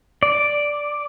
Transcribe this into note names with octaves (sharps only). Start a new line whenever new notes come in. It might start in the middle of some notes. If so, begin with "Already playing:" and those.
D5